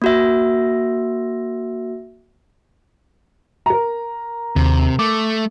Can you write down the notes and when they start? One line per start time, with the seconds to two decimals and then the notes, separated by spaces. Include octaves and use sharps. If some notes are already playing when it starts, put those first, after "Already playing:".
0.02 A#3 F#4 E5
3.66 A#4 A#5
4.56 D#2 C3
4.99 A3 D6